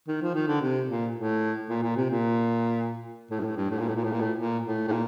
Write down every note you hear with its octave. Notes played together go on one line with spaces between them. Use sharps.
D#3
F3
D#3
D3
C3
A#2
A2
A#2
A#2
C3
A#2
A2
G2
A2
G2
A2
A#2
A2
A#2
A2
A#2
A2
A#2
A2
A2
A#2